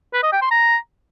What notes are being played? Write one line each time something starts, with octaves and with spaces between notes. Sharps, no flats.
B4
D#5
G5
C6
A#5